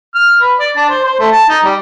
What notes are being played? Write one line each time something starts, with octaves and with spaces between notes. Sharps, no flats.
F6
B4
D5
D4
C5
C5
A3
A5
D#4
G3